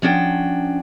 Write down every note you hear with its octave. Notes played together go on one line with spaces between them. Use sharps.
F3 C#4 D4 F#4 G5